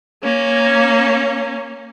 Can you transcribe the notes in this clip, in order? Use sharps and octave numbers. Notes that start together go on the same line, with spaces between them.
A#3 C#4